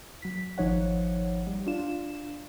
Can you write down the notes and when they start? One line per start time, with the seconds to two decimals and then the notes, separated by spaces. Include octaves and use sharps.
0.22 F#3 B6
0.58 G#1 F3 D#4 C#5 F#5
1.47 G3
1.67 D4 F4 E7